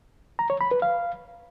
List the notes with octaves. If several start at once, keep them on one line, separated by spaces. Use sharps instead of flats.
A#5
C#5
B5
B4
F5